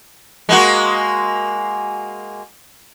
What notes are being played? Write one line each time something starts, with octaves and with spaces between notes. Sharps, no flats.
G#3 A#3 F#4